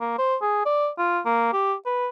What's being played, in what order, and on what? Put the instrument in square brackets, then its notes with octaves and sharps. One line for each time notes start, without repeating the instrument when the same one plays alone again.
[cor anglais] A#3
C5
G#4
D5
F4
A#3
G4
B4